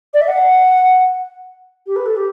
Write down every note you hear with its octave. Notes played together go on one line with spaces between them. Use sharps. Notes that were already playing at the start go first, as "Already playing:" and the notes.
D5
E5
F#5
G4
B4
A4
G4